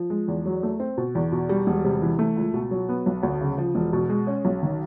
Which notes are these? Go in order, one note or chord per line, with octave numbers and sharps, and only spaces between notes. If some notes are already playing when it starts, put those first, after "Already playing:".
Already playing: F3
G#3
E2
F#3
A3
C4
B2
E2
B2
G3
E1
C3
E3
A3
C#2
B2
F#3
B3
B1
D2
C#3
F3
E1
B2
G#3
C#4
B1
D#3